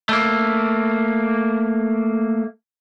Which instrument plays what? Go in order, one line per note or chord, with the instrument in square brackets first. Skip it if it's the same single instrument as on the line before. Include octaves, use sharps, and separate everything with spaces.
[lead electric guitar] A3 A#3